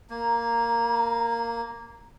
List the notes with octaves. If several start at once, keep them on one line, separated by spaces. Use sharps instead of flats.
A#3 A#5